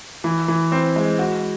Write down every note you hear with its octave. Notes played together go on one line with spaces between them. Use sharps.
E3
E3
C4
G#3
F#4